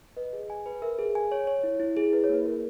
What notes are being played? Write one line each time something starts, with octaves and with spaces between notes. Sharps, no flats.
B4 D#5
G#4
G#5
B4
A#4 E5
G#4
G#5
C#5
C#5
E4
E4
G#4
E4 B4
C#5
A#3 B4
G#4 A#4